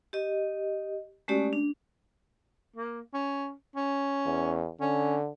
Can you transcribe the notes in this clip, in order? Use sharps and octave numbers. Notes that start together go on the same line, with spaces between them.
G4 D#5
G#3 A3 C#4 F#4 G4 D5
D4
A#3
C#4
C#4
E2
D3 C#4